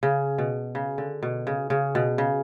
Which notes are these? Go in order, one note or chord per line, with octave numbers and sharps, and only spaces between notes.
C#3
B2
C#3
D3
B2
C#3
C#3
B2
C#3